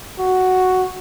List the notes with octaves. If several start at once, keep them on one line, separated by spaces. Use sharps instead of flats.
F#4